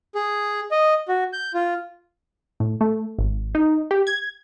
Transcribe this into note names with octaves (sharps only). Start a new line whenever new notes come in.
G#4
D#5
F#4
G6
F4
A2
A3
G#1
D#4
G4
G#6